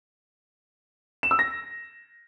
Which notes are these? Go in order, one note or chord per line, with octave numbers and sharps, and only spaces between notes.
E7
E6
A#6